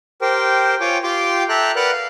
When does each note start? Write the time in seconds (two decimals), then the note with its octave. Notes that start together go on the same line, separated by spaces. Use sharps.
0.22 G4 A#4 C5 G5
0.81 F4 C#5 G5 G#5 D6
1.03 F4 G4 G5 C6 D6
1.49 A4 E5 G5 A#5 F#6
1.76 A#4 B4 D5 F#5 A#5 F#6
1.92 F5